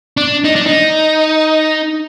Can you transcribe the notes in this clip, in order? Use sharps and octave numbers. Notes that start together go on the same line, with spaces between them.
D4
D#4
D4
D#4